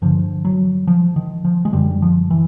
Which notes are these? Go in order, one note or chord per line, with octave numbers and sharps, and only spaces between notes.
G2 D3 F3
F#3
F3
D#3
F3
G#3
F#2 D3 G3
F3
E3